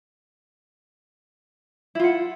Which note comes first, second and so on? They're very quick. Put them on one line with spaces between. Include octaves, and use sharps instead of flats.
E4 F4 F#5